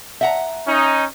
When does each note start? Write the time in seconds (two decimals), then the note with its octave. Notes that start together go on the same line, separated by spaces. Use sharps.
0.21 E5 F#5 A#5
0.67 C#4 D#4